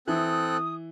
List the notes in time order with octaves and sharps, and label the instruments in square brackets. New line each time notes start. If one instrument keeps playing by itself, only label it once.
[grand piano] E3 [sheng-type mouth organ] C4 A4 F#6 [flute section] D#6